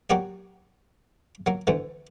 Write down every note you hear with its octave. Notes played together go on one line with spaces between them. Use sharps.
F#3 A#3 F#4 G4 D5
F#3 A#3
D2 D3 E3